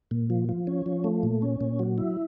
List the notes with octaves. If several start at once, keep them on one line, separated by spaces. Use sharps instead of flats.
A#2
F3
F3
C#4
F3
A3
A#2
C#4
A#2
F#3
E4